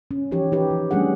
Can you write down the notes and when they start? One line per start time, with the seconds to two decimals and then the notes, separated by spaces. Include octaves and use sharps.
0.11 C#4
0.31 E3 F3 D#4 G4 C#5
0.52 D#4 G4 B4
0.71 F3
0.91 G3 A3 C#4 D4 G#4 F#5